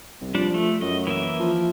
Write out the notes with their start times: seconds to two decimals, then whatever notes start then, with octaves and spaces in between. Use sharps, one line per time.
0.21 C2
0.35 F3 G3 D4
0.54 A3
0.81 F#2 D#5
1.07 E3 A#3 E5
1.40 F3